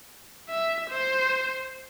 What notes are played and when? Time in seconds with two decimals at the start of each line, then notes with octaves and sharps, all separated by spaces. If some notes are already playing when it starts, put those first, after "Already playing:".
0.49 E5
0.90 C5